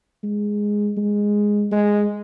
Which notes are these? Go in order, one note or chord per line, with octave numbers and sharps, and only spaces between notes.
G#3
G#3
G#3